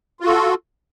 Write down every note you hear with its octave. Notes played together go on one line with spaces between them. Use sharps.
F4 F#4 A4